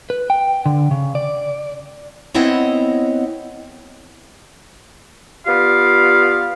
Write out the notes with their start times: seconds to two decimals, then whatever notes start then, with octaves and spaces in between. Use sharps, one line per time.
0.10 B4
0.30 G5
0.66 D3
0.91 C#3
1.15 D5
2.34 B3 C4 E4 C#5 D#5 F#5
5.46 B3 F4 G4 D5 F5